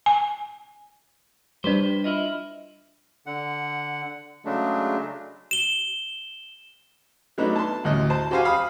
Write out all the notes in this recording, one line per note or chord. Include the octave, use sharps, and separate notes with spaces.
G#5
G3 D4 G4 B4 C5
E4 F4 D#5
D3 F#5
C#3 F#3 G#3 A3 D4
E7 G7
F#3 A3 B3 D4 D#4
A5 C6
A1 D2 D#5
C5 A5
F#4 G4 C5 F5 G#5
F5 B5 D#6